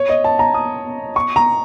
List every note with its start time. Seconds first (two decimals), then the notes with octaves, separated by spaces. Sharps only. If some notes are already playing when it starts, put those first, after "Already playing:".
Already playing: C#5
0.09 D#5
0.24 A5
0.39 A#5
0.54 D#6
1.16 C#6
1.36 A#5